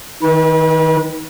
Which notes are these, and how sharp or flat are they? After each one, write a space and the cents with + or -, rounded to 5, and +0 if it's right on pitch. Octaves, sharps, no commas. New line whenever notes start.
D#3 +20 B4 -35